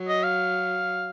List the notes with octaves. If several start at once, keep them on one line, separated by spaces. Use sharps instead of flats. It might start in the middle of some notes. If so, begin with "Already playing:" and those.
Already playing: F#3
D#5
F5